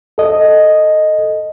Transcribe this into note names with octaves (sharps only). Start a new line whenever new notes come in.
A4 D#5